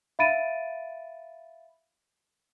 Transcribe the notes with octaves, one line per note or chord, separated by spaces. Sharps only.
E5 F5 B5 A6 D7 D#7